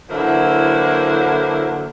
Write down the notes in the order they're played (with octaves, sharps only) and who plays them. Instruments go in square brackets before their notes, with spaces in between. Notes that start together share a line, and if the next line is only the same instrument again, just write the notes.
[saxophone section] D3 E3 F#3 A#3 E4 C5